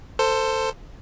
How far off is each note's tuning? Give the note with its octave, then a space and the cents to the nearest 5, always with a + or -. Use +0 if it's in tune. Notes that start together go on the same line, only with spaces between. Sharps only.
A4 +20 C5 +0